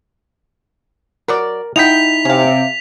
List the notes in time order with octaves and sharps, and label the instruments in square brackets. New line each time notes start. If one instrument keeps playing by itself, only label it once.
[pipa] F#3 F#4 D5 [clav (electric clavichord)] A#4
[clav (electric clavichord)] D#4 E4 [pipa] D#5 F#5 G5 [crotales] B6 F7
[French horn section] C3 [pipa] C#4 F5